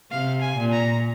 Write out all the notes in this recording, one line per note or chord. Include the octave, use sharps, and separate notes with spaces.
C3 F5
G#5
A#2
A#5